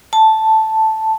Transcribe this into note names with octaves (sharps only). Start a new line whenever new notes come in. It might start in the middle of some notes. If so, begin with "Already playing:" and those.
A5